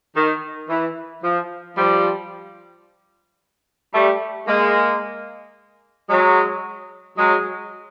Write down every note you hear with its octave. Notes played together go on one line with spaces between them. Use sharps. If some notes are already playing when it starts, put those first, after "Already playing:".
D#3
E3
F3
F3 G3
G3 A3
G#3 A#3
F#3 G#3
F#3 G#3